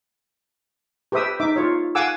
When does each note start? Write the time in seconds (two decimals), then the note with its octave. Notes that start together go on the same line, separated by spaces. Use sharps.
1.12 G4 B4 C5 E5 D#6 E6
1.40 D#4 E5 D6
1.56 F4 C#5
1.95 F5 F#5 G#5 D6 E6